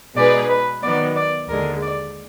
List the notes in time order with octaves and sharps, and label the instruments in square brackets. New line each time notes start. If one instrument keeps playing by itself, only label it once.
[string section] B2 G#3 D#4 G#4 B4 [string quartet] D5
[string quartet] B4
[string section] D#3 F#3 B3 [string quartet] D5
[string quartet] D5
[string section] D#2 D3 G#3 [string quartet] A#4
[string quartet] D5